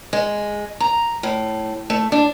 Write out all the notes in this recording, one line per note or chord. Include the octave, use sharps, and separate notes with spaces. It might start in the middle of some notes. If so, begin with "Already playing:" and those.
G#3
A#5
A2
A3
D4